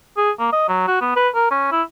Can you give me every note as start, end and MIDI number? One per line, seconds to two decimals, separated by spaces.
0.17 0.31 68
0.39 0.50 58
0.52 0.67 75
0.68 0.82 54
0.88 1.00 66
1.01 1.13 59
1.16 1.29 71
1.34 1.48 70
1.51 1.69 61
1.72 1.82 64